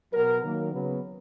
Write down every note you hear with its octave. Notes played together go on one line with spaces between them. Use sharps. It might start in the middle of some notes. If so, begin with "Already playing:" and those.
B2 F#3 B3 A#4
D#3 F#3 A#3
C#3 F#3 B3